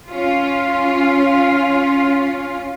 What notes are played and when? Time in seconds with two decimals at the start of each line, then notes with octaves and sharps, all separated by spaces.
0.10 C#4 F4